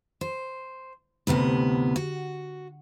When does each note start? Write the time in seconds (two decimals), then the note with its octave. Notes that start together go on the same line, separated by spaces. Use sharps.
0.21 C5
1.27 D2 A2 C3 B3
1.96 F#4